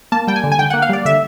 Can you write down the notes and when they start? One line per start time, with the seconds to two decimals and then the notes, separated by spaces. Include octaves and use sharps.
0.12 A#3 A5
0.27 G3 G5
0.36 G#5
0.44 D3
0.52 G#5
0.58 D3 G5
0.70 A#3 F#5
0.82 F5
0.89 G3 D5
1.05 D3 E5